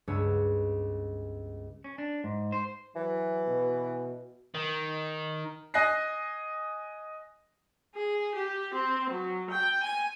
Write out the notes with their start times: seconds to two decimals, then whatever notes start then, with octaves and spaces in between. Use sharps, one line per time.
0.07 C#2 G2 G#3 B3 C#5 E6
1.84 C#4
1.98 D4
2.24 G#2
2.52 C5
2.96 E3 F#3
3.47 B2
4.55 D#3
5.74 D#5 G#5 F#6 A#6 C7
7.95 G#4
8.34 G4
8.74 C4
9.10 F#3
9.50 G5
9.83 G#5